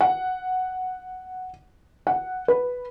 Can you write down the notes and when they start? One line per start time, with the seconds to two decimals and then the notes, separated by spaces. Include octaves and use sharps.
0.01 F#5
2.07 F#5
2.48 B4